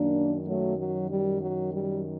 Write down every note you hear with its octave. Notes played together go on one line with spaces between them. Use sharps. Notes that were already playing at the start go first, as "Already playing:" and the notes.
Already playing: F#2 D#3 A#3 D4
F#3 A3
F#3
G3
F#3
G3